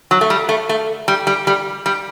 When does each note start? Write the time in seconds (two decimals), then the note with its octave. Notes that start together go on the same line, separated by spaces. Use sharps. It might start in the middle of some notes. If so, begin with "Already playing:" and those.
0.11 F#3
0.21 A3
0.30 G3
0.49 A3
0.69 A3
1.08 G3
1.27 G3
1.47 G3
1.86 G3